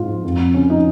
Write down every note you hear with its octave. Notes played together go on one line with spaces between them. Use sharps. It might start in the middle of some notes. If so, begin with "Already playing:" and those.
Already playing: G#2 F4
F3
F2
F2
C#3 C#4
F3 D#4